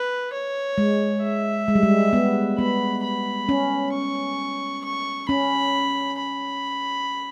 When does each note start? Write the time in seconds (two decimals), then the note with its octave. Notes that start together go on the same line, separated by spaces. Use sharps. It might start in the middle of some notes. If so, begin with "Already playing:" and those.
Already playing: B4
0.33 C#5
0.78 G#3
1.23 E5
1.68 G#3
1.75 G3
1.83 G#3
2.13 B3
2.58 B3 B5
3.03 B5
3.49 C#4
3.93 C#6
4.84 C#6
5.29 C#4 B5
6.19 B5